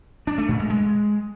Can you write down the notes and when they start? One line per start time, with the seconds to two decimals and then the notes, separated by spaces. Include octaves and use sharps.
0.27 D4
0.38 A3
0.49 A#2
0.59 G#3
0.70 G#3